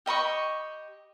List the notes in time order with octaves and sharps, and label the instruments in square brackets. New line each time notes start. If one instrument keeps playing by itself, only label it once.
[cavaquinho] G4 D#5 B5 C#6